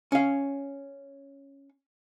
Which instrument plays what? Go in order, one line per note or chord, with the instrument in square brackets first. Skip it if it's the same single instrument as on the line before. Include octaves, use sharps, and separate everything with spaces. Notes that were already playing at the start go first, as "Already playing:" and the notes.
[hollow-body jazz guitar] C#4 F5